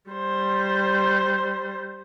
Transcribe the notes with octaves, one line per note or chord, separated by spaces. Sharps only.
G3 C5